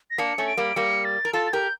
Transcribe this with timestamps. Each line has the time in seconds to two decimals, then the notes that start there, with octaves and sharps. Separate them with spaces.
0.11 A#6
0.18 A#3 D4 C#7
0.38 A3 C#4
0.47 D7
0.57 G3 A#3
0.76 G3 A#3 C#7
1.05 A6
1.25 A#4
1.33 F4 A4 A6
1.47 A6
1.53 G4 A#4 G6